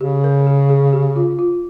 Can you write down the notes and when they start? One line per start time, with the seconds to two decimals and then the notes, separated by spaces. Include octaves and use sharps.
0.01 C#3 G4
0.24 A#4
0.47 G#4
0.70 G#4
0.93 G4
1.16 F4
1.39 F4